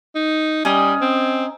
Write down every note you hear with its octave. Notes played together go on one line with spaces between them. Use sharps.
D#4
G3 C#4 D#4 D#5
C4